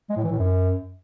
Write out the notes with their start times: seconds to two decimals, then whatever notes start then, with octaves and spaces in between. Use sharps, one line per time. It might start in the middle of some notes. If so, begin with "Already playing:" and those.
0.10 G#3
0.17 A2
0.24 E3
0.32 A2
0.39 F#2